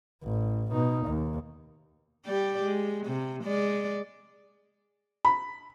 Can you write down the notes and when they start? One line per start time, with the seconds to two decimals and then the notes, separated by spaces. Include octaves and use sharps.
0.23 A1
0.72 B2 D#4
1.07 D#2
2.26 G3 G4 D5
2.62 G#3
3.07 C3
3.44 G#3 D5
5.25 B5